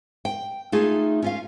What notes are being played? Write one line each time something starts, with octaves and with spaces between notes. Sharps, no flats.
G5
A3 D#4 F4 G#4
C#4 F4 F5